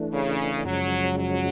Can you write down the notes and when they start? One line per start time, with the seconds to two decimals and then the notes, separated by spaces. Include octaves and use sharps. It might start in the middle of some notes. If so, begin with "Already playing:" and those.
Already playing: E3 A3 D4
0.12 C#3
0.65 F#2 C#3 F3 F#3 G#3 C#4
1.17 F#3